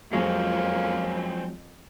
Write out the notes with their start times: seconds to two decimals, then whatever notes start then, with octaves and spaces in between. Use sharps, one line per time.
0.13 F2 F3 F#3 G#3 A#3 C4 C#4